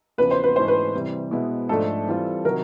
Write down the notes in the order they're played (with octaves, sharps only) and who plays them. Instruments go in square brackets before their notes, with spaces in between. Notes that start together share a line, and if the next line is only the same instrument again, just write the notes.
[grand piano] E2 C#3 F3 [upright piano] B4
[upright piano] C5
B4
[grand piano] G#2 E3 A3 C#4 [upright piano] C5
[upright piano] B4
[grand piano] C3 E3 G3
B2 G#3 B3 E4
[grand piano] G#2 F3 A3 D4 [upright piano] A4
[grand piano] E3 G3 C4 F4
[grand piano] C3 D#3 F#3 [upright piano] A#4